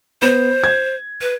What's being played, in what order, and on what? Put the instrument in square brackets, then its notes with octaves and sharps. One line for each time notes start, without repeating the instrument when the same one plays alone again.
[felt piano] B3 [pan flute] C5
[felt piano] G#6
[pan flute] B4